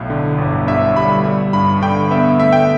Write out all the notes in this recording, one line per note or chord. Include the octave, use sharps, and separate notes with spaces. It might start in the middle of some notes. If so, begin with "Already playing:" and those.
Already playing: B1 A2
D3
G1
G2 E5
G3 B5
G3
G2 B5
D3 G5
B3 E5
A3 E5
G5